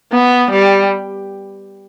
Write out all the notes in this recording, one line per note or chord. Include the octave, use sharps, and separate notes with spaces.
B3
G3